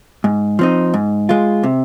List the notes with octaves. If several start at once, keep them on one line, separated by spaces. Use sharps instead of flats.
G#2
F3 C4 D#4
G#2
G#3 F4
C3